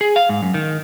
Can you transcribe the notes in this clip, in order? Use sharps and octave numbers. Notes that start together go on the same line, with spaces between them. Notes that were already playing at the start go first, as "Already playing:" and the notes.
G#4
F5
G#2
F#2
D#3